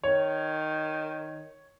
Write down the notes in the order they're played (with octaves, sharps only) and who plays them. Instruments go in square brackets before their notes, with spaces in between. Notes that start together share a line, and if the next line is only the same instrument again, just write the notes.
[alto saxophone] D#3 [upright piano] C#5